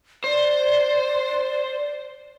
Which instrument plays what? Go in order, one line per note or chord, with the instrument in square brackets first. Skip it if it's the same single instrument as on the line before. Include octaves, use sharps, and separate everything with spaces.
[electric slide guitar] C5 [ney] D5